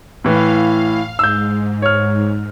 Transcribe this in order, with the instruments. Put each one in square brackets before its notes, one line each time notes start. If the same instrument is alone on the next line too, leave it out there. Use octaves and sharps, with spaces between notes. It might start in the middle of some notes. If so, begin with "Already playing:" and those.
[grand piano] A2 E3 [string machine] F5
[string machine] G#2 [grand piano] E6 G6
[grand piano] C#5 F6